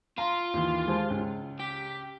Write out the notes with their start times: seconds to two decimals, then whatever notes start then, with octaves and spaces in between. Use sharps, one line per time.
0.18 F4 A#5
0.54 D#2 D#3 E3
0.88 G#3 G4 C5 A5
1.10 C#2 C#4
1.60 G4 B6